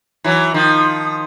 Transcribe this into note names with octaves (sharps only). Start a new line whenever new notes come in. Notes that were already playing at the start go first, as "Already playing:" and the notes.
E3 F#3
D#3 F3